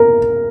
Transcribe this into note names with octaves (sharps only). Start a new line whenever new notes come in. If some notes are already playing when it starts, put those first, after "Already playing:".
Already playing: A#4